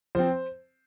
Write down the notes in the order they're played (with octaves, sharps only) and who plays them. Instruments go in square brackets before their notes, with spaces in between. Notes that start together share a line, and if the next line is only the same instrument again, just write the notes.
[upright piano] F3 C4 C5